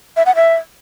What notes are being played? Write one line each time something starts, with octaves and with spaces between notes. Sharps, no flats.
E5
F#5
E5